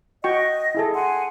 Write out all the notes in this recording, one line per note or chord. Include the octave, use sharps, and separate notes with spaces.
F#4 D#5 G5 C#6
E4 G#4 A4
F#5 G#5 C6